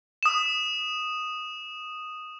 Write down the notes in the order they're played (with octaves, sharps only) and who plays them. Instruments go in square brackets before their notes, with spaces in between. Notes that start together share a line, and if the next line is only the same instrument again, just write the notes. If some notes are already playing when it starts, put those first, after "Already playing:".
[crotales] D#6 E7